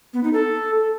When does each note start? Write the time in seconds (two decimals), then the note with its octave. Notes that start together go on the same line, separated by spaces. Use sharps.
0.14 B3
0.23 D#4
0.33 A4